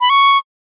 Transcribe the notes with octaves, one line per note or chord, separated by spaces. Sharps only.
B5
C#6